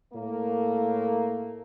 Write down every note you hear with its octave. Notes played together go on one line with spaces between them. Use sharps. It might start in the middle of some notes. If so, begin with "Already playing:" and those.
A2 A3 A#3